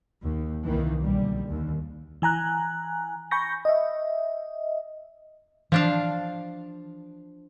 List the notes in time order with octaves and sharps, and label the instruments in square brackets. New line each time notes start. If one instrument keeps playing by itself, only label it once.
[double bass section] D#2
C2 D#3 E3 A#3
B1 D3 G3
D#2
[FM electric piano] E3 G#5 A#5 F#6
G#5 B5 C#6 G6 A#6
D#5 E5
[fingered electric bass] E3 [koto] F3 D4 F5